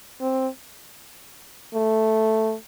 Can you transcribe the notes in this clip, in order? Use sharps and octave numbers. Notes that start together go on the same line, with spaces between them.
C4
A3